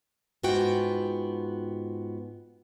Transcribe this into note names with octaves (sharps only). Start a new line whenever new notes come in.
G#2 B3 F4 F#4 G5